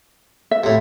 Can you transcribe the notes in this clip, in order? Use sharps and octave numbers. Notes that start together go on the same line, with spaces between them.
E5
A2 C3